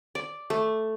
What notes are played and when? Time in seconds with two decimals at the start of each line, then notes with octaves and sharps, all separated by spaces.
0.15 D5
0.50 A3